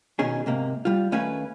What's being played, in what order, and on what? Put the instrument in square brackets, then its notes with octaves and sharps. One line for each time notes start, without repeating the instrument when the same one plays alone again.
[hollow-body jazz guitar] B2 D#3 C#4 G#4
G#2 C3 A#3
G3 F4
D#2 A3 C#4 B4 F5 G#5